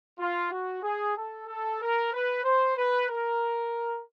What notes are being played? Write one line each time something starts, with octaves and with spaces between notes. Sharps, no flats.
F4
F#4
G#4
A4
A4
A#4
B4
C5
B4
A#4